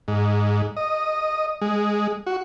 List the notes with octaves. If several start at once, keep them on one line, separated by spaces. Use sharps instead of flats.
G#2
D#5
G#3
F#4